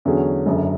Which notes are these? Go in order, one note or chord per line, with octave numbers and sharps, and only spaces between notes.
E2 D3 F#3 C#4 G#4
F#1 F#2 D3